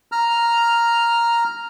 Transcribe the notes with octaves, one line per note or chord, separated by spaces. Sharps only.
A#5 F6